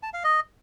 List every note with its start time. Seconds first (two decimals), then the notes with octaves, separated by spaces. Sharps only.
0.03 A5
0.13 F5
0.24 D#5